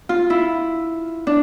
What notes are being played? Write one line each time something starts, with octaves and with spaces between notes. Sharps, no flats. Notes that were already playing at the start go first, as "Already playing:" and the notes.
F4
E4
D4